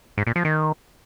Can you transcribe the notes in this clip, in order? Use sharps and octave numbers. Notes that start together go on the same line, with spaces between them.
G#2
A#2
F3
D#3